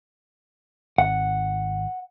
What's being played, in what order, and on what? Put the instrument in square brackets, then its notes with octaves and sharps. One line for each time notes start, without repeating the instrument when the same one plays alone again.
[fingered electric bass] G#1 [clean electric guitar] F#5